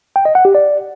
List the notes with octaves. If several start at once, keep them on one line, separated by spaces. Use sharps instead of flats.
G5
D#5
F#5
G4
D5